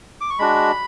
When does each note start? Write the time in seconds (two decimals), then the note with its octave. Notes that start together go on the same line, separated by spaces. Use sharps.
0.21 D6
0.30 C#6
0.39 G#3 D4 F#4 B5